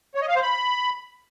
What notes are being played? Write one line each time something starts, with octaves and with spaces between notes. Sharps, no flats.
C#5
D#5
F5
C5
B5